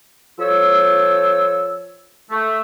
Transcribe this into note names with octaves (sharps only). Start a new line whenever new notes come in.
F3 A4 C5 C#5 E6
A3